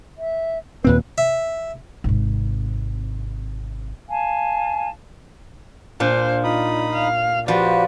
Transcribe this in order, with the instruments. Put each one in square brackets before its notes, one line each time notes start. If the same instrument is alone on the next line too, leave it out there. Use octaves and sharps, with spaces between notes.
[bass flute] E5
[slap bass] D#2 A#2 C4 [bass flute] B4
[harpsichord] E5
[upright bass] G#1 C3
[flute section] F5 G#5 A5
[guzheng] A#2 D4 [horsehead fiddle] C5
[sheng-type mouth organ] D#4 B5 D#6 [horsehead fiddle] F4
[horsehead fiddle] F5
[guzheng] F3 [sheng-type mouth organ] F#4 B4 [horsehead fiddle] G4 D5